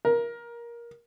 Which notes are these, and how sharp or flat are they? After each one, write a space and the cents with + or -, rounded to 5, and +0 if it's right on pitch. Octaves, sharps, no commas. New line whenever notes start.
A#4 +15